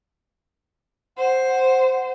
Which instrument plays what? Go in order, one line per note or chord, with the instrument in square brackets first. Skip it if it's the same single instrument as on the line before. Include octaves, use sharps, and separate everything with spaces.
[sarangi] C5 [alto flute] F#5